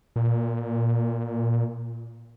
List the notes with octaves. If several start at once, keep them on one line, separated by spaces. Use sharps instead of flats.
A#2